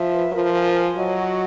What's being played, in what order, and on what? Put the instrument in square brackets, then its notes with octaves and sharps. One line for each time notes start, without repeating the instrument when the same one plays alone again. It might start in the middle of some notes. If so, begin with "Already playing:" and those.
Already playing: [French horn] F3 [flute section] E5
[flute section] B4
[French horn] F3 [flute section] A#4
[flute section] G#5
G#5
[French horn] F#3 [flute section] D#5
[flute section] F#4